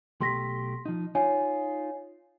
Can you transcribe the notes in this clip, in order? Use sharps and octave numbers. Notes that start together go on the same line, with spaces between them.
B1 A3 G4 C6 A#6 B6
F3 D#4
D#4 F4 C#5 G#5